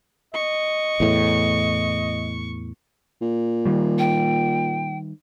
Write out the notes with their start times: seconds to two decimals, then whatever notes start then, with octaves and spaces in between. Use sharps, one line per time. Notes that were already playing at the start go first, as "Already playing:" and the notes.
0.34 D#5 C#6
1.00 E2 A2
3.21 A#2
3.66 D#3 G3
3.99 G5